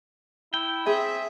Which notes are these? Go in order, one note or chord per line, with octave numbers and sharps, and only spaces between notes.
E4 G5
C4 G#4 E5